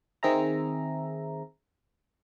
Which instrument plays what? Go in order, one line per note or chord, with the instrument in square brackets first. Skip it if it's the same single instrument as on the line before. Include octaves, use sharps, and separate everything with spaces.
[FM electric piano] D#3 C4 G#4 E5 A#5